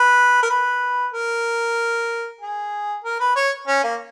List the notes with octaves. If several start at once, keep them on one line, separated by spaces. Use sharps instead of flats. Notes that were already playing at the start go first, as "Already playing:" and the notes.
Already playing: B4
A#4
B4
A#4
G#4
A#4
B4
C#5
C#4
A#3